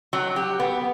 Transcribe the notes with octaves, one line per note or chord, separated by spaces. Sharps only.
F#3
G4
B3